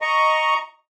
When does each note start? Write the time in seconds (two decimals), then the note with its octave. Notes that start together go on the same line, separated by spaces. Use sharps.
0.01 D#5 A#5 C#6